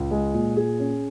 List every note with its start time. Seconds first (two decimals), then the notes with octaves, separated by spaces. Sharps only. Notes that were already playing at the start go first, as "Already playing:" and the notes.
Already playing: C#2
0.11 G#3
0.34 A#2
0.57 G#4
0.79 C#4